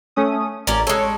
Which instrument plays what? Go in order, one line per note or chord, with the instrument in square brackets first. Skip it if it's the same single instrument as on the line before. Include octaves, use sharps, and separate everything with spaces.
[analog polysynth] A3 C#4 D#6
[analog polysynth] A1 [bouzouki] C#4 A#4 D5
[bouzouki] G#3 A4 [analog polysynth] C#5